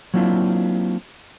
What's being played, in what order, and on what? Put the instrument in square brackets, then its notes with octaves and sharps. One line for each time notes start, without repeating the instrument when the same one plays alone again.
[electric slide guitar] F#3 A#3 C4 D4 E4 F4